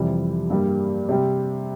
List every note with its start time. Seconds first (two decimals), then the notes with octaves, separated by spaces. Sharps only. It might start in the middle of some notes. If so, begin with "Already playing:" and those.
Already playing: F2 C3 E3 G3
0.50 G2 G3 A#3
1.09 C3 G3 C4